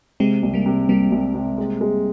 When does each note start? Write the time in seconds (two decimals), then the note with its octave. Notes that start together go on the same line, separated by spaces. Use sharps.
0.20 C3 G#3 C4
0.43 C2
0.54 G3 A#3
0.66 C3
0.89 C2 G3 A#3
1.12 C2
1.35 C3
1.58 G#3
1.81 G#3